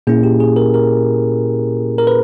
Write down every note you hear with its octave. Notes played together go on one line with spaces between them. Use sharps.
A#2 A#3 C#4 E4 G#4
G4
G#4
A#4
A#4
A#4
B4